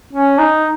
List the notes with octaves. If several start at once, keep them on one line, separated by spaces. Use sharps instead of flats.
C#4
D#4